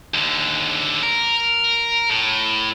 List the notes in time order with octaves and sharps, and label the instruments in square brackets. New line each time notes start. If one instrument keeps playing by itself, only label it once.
[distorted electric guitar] D#2 D3
A#4
A2